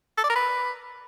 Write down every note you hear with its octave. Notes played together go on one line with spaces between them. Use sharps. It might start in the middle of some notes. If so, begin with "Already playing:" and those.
A4
D5
A#4
B4